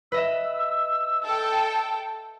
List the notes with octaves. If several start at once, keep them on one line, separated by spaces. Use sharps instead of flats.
B4 D#5 E5 E6
A4 G5